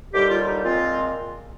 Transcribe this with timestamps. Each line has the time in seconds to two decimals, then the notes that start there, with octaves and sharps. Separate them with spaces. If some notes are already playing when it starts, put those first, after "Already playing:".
0.13 D#2 D3 G3 G4
0.29 F4
0.47 D#4
0.64 A#2 G#3 C4 F4